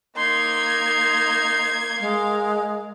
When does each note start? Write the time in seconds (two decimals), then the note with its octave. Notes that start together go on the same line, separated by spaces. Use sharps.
0.17 A#3 D#4 C6 G#6
2.00 G#3 A#4 F5